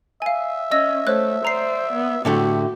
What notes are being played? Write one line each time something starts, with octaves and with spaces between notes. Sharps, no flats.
E5 F5 G#5
C#4 D#5 E6 A#6
A3 C5 C#5 F#6
C5 D5 A#5 C7
B3
A2 D3 A3 F#4 G4